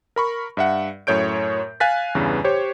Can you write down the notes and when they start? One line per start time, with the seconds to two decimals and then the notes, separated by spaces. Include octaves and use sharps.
0.16 A#4 B5 C#6
0.57 G2 E5 F#5
1.07 F#2 A2 C#5 G6 D7
1.80 F5 G#5 F#6 A6 B6
2.15 E2 G2 C#3 E3
2.44 G4 C5 C#5